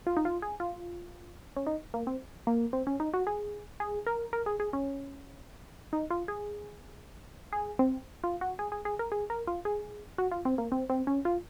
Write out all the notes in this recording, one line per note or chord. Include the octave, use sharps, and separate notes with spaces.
F4
D#4
F4
G#4
F4
C#4
D#4
A#3
C4
A#3
C4
C#4
D#4
F#4
G#4
G#4
A#4
A#4
G#4
G#4
C#4
D#4
F4
G#4
G#4
C4
F4
F#4
G#4
G#4
G#4
A#4
G#4
A#4
F4
G#4
F#4
F4
C4
A#3
C4
C4
C#4
F4